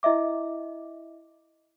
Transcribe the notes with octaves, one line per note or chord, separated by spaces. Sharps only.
E4 D#5 E5 D6